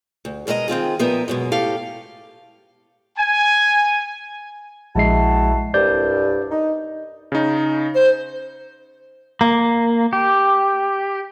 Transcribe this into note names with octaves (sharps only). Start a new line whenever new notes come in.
D2
B2 G#3 A#4 B4 D#5
D#3 C4 F4 G#4
A#2 F3 B3 D#4 A#4 E5
F#2 B2 G#3
A2 G4 A4 F5
G#5
A#1 G#3 E4 F#4 A5 C7
C2 G2 D5 G6
D#4
C#3 D#4
C5
A#3
G4